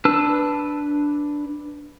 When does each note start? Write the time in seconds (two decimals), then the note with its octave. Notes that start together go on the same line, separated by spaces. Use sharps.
0.05 D4 B4 A5 E6